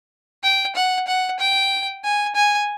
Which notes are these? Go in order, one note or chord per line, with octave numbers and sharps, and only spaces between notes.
G5
F#5
F#5
G5
G#5
G#5